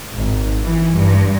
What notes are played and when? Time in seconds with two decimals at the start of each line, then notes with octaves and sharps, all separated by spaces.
0.16 G#1
0.64 E3
0.97 G2